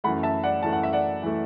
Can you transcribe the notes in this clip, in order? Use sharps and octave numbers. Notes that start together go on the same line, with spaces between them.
F#2 E3 A3 F#5 B5
E5 A5
D5 F#5
F#2 E3 A3 A5
F#5
E5
D5 F#5
E3 A3